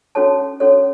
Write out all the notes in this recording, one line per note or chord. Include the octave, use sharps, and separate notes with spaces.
C#4 F#4 A4 C#5 A5
C#4 F#4 A4 C#5